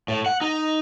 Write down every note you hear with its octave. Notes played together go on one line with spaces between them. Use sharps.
A2
F#5
D#4